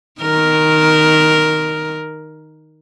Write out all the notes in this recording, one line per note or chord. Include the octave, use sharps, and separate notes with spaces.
D#3 A#4